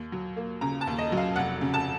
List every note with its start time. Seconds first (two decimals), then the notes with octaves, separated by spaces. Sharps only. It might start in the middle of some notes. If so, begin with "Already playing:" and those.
Already playing: D#2
0.12 F#3
0.37 A#3
0.61 C#3 A#5
0.81 A5
0.87 D#2
0.98 D#5
1.12 F#3
1.17 F5
1.36 F1 F#5
1.61 C#3
1.74 A5